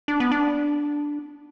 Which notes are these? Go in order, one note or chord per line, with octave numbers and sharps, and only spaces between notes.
D4
B3
D4